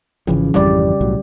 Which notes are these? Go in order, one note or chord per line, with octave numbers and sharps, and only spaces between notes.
G#1 C#3 E3 F3
G#1 F2 E3 G3 G4 D5
B1 A2 F#3